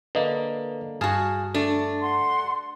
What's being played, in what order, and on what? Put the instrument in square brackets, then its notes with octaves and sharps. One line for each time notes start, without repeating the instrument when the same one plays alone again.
[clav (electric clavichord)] D3 A#3 [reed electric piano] B4 D#5
[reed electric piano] G2 [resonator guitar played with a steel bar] F#4 A5 [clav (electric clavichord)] G#4 F5
[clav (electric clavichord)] A3 [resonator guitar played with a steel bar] D4
[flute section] F#5 C6